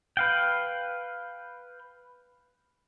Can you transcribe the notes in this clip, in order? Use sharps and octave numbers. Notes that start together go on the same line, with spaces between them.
B4 F5 G5